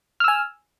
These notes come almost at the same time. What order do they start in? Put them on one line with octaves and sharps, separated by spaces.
F6 E6 G#5